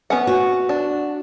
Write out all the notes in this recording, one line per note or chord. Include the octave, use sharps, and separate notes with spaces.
B3 C#4 F#5
F#4
D4